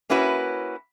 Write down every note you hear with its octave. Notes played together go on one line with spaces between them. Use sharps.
A#3 C#4 E4 F#4 B4